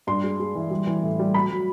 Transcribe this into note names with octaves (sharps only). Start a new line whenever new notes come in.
G2 C6
G#3
G#3
E3
G3
E3
A2
G3
F#3 B5
F#3